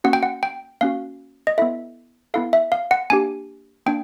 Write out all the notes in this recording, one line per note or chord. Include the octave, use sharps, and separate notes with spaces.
A#3 C#4 F#4 F#5
G5
F#5
G5
A#3 C#4 F#4 F5
D#5
B3 E4 A4 E5
B3 E4 A4 F5
E5
F5
F#5
A#3 D4 G4 G#5
A#3 D4 G5